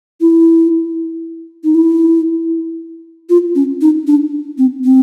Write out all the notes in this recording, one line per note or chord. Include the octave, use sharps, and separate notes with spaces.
E4
D#4
E4
F4
C#4
D#4
D4
C4
C4